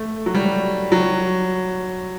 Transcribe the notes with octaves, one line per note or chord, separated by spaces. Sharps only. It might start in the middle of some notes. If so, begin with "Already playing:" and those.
Already playing: A3
F#3
G3
F#3